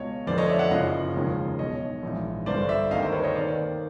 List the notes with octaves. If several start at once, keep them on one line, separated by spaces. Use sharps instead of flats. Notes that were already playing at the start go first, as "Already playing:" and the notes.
Already playing: C#2 B2 C#5 D#5
F1 F2 D3 C5 D5
C#5 D#5
D5 E5
E5 F#5
F#1 F#2 C#3 F3 D#5 F5
E1 D#2 C#3 F3
B1 B2 C#5 D#5
A#1 G#2 E3
G1 G2 D3 C5 D5
D5 E5
D2 C3 D#3 D#5 F5
A#4 C5
B4 C#5
C#5 D#5
D#2 D#3 C5 D5